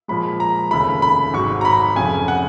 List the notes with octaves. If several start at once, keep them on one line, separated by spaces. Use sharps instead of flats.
A#2 F3 G#3 B5
A#5
F1 D#2 C#3 B5
B5
G#1 G#2 F#3 C#6
A#5
B5
F1 F2 C#3 G#5
F#5